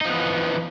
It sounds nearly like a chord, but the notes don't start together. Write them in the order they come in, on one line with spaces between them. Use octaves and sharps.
D#4 F3 B3 E3